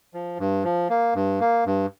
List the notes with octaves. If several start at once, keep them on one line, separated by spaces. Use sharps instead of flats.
F3
G2
F3
A#3
G2
A#3
G2